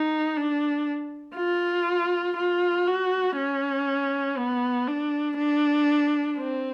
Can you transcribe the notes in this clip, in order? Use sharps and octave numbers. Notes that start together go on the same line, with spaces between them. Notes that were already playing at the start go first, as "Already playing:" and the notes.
Already playing: D#4
D4
F4
F4
F#4
C#4
B3
D4
D4
C4